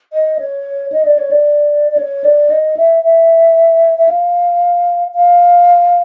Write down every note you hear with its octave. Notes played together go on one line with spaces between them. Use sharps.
D#5
C#5
D#5
D5
C#5
D5
D5
C#5
D5
D#5
E5
E5
E5
F5
F5